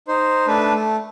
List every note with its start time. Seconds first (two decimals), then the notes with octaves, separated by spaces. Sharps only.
0.08 D#4 C5
0.47 A3 D4 B4
0.74 A3